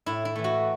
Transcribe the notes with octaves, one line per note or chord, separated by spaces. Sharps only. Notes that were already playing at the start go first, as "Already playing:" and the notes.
A2 E4
E4
E3 A3
F#4